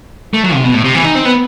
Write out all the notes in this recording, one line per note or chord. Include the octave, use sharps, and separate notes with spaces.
A3
F#3
C3
B2
A2
C3
E3
D#4
C4
B3